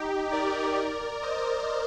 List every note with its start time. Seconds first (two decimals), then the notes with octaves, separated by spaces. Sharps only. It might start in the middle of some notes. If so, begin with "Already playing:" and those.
Already playing: D#4 G4
0.32 A#4 D5
0.77 A#4 D5
1.23 C5 D#5